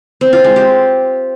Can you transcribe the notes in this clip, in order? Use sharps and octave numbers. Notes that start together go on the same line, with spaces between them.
C4
F4
G#3
G4